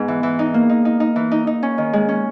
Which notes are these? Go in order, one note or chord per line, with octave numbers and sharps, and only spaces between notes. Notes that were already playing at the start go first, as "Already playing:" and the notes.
Already playing: G#2 B3
E3
E3
D#4
A#3
D#4
D#4
D#4
E3
D#4
D#4
C#4
D#3
G#3
C#4